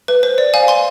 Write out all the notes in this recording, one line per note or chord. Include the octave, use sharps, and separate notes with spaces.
B4
C5
D5
F5 G#5
G#5 C6